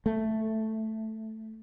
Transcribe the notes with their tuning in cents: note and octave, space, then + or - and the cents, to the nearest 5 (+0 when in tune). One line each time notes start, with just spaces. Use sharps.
A3 +0